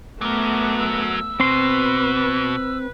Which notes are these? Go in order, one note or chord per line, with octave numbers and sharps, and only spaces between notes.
F#3 A3 B3 A#4 D6
E6
B2 C4 B4 C6